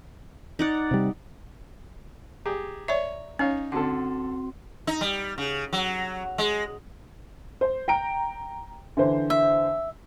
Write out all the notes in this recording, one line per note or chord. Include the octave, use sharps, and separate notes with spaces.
D#4 D5 F#5
C3 G3
G4 G#4 A#5
C#5 D5 E5
C#4 D#4 C#5 F5
D3 C4 F#4 A4 C6
D#4
G3
C#3
F#3
G#3
C5
G5 A#5 D7
D3 E3 C5
E5